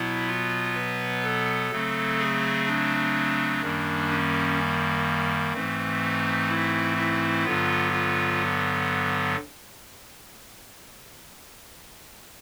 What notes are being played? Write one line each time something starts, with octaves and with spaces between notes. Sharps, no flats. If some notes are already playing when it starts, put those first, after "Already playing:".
Already playing: B2 F#3 B3 E4
F4
B4
A4
C#3 F#3 A3 C4
G#4
D4
F#2 D#3 G3 A#3
C#4
G#2 E3 A3 C4
D#4
E4
E4
G2 D3 F#3 B3 F4
F4